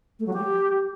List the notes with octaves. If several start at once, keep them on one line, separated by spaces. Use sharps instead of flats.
A3
F#3
G4